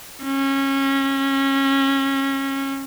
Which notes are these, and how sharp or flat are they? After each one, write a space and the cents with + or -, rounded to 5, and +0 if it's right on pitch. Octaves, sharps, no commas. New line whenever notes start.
C#4 -25